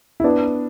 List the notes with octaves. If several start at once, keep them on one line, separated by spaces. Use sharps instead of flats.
E4
B3 D4